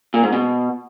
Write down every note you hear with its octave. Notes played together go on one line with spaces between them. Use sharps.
A#2
G#2
B2